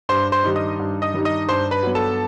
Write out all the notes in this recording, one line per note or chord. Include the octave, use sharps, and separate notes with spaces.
G2 C5 C6
C5 C6
D#3 G3 D#4
D#5 D#6
G2
D#5 D#6
D#3 G3 D#4
D#5 D#6
G2 C5 C6
B4 B5
F#3 B3
A4 A5